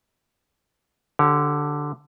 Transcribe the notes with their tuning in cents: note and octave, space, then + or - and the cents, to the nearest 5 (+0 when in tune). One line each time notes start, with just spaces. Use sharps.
D3 +0 G4 -25 C#5 +0